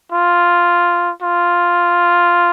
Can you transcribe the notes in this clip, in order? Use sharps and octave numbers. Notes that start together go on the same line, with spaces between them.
F4
F4